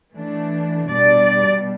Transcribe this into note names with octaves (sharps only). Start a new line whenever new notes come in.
E3 A3 D4
B2 G3 D4 D5